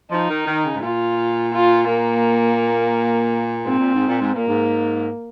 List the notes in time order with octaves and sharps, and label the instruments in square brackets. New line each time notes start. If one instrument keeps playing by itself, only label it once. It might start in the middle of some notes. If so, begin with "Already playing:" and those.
[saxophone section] F3 [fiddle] D#4
[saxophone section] D#3
D#3
C#3
G#2
[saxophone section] A#2 [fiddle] F4
[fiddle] F4
A#3
[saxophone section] G#2 [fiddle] C4
[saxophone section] A#2
G#2
A#2
G#2
[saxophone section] A#2 [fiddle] A#3
[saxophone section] G#2